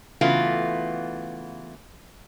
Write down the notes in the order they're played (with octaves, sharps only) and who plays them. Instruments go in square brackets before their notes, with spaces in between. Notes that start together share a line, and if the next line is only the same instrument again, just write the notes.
[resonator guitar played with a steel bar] C#3 E3 A3 B3 F4 F#4